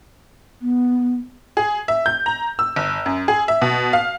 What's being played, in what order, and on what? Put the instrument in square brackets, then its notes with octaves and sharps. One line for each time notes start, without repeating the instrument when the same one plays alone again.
[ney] B3
[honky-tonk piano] G#4
E5
G6
A#5
E6
G1
F#2
G#4
E5
B2
F5